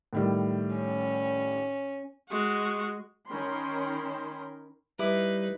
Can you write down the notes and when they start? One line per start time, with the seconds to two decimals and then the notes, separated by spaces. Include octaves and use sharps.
0.13 A2 D#3 G3
0.76 C#4
2.30 G#3 F#4
3.28 D#3 C#4 A#4 G5 B5 C6
4.99 G3 D#4 E4 B4 D6